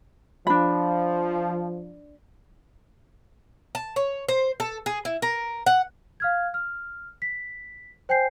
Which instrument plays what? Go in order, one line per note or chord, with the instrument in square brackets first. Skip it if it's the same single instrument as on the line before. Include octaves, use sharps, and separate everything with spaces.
[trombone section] F3 [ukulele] D4 B5
[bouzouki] A5
C#5
C5
A4
G#4
E4
A#4
F#5
[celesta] F5 F6 G#6
F6
B6
C5 G5 G#5 G6 C7